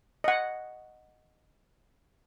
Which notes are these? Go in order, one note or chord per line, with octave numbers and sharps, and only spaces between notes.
D#5 F#5